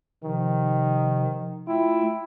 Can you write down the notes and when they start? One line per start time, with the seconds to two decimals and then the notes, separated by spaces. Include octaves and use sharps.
0.24 C3 D#3 F3
1.68 A3 E4 F4 G5